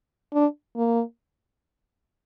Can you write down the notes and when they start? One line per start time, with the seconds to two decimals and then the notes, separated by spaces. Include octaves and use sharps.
0.34 D4
0.76 A#3